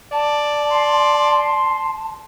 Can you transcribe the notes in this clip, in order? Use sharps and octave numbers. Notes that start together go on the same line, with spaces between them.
D5 A5
C6